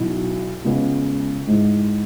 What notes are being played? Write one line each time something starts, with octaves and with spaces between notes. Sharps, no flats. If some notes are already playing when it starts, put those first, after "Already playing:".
Already playing: B1 B2 F#3 B3 E4
C#2 C#3 G#3 B3
G#2 G#3 E4